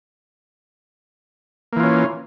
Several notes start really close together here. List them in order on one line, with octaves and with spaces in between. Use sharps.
A#3 E3 F4 C#4